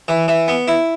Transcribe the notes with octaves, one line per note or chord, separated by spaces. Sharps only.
E3
E3
B3
E4